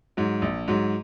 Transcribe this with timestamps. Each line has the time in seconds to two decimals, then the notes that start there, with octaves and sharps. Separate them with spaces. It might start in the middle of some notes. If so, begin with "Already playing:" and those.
0.17 G#2 F#3
0.42 A#1
0.68 G#2 F#3